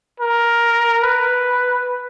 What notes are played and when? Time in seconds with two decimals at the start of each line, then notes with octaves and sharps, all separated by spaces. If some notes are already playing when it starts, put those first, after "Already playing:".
0.20 A#4
1.03 B4